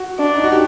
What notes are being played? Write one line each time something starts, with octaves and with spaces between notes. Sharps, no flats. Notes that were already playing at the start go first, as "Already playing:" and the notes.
Already playing: F#4
D4
D#4
F#4
G4